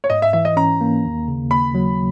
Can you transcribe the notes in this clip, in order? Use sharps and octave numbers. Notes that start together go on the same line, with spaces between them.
C#5
G#2 D#5
E5
E3 E5
D#5
C#4 A#5
A#3
D#2
C#3
D#2 B5
F#3